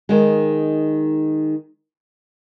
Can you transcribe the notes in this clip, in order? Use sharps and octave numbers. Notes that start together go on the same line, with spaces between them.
D#3 G#3